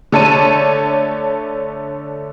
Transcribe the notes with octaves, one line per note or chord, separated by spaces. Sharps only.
D3 A3 A4 C#5 A5 D#7